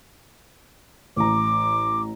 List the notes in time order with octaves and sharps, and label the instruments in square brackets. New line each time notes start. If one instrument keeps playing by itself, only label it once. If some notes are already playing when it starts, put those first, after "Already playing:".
[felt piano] A1 A#5 [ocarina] D6